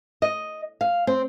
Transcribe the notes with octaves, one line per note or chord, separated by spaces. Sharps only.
D#5
F5
C4